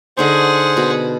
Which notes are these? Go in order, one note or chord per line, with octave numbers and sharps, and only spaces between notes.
D3 D#4 G#4 C5 F#5 C#6
B2